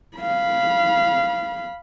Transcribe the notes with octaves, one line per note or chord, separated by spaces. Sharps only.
F5 B5